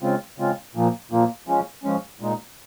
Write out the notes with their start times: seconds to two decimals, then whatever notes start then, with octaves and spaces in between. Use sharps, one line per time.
0.02 C#3 G#3 C4 F4
0.38 C#3 G#3 C4 F4
0.75 A#2 F3 A#3
1.11 A#2 F3 A#3
1.47 F3 G#3 C#4
1.84 F3 G#3 C#4
2.20 A#2 G#3 D#4